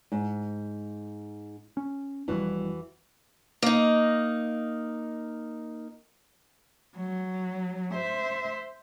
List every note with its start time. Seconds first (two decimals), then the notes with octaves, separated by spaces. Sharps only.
0.12 G#2
1.77 C#4
2.28 F#1 F2 E3 G3 F#4
3.62 A#3 D#4
6.97 F#3
7.94 C5 E5